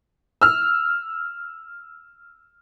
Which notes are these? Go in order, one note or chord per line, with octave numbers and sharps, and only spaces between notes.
E6 F6